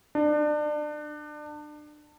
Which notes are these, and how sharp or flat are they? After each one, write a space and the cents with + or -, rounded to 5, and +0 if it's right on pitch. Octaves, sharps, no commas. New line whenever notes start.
D4 +30